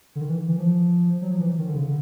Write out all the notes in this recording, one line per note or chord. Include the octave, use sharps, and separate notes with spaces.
D3
D#3
E3
E3
F3
F#3
F3
E3
D#3
D3
C#3
D3